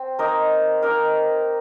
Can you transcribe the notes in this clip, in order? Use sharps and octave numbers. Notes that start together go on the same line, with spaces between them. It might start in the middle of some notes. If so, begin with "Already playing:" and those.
Already playing: C4
A#3 D#4 A#4
A#3 D#4 A#4